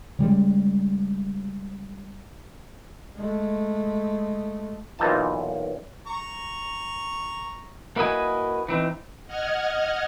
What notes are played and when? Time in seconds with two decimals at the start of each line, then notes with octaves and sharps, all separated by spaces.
0.19 C#3 G3 G#3
3.14 G#3 A3
4.99 B1 A#2 E3 D#4 F4 A5
6.07 A#5 C#6
7.96 A#3 E4 F#4 B4 D#5 G#5
8.68 E3 C4 D#4
9.26 D#5 F#5 F6 G#6